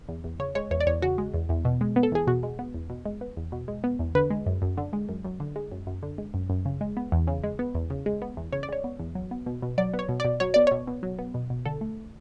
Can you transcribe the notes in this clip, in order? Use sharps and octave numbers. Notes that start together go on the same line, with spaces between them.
E2
E2
C#3 C#5
G#3 C#5
E2 C#5
D5
E2 C#5
C#3 F#4
G#3
E2
E2
B2
G#3
B3
A4
E2 G#4
B2 F#4
G#3
B3
E2
B2
G#3
B3
E2
B2
G#3
B3
E2
D3 B4
G#3
F#2
F#2
D3
G#3
F#2
F#2
D3
G#3
F#2
F#2
D3
G#3
F#2
F#2
C#3
G#3
B3
E2
C#3
G#3
B3
E2
C#3
G#3
B3
E2
C#3 C#5
D5
G#3 C#5
B3
E2
F#3
B3
B2
B2
F#3 D5
B3
C#5
B2
D5
B2
F#3 C#5
B3 D5
B2 C#5
B2
F#3
B3
B2
B2
D3 A4
A3